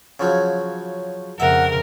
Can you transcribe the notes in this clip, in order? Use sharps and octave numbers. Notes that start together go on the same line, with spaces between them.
C#3 F3 F#3
F2 C#3 A#4 E5 F#5